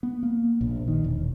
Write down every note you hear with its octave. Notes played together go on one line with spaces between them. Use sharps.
B3
A#3
A#1
D#3
E1